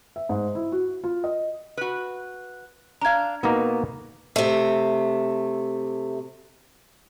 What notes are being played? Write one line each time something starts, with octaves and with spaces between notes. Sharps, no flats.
E5
G#2
E4
F#4
F4
D#5
F#4 B4
D4 F5 A#5 G#6
B2 A#3 B3 D#4
C3 A3